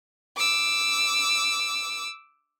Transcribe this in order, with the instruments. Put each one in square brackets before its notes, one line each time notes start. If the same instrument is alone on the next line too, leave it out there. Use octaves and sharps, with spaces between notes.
[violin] D6 E6